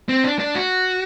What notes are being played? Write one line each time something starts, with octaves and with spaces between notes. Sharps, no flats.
C4
D4
D4
F#4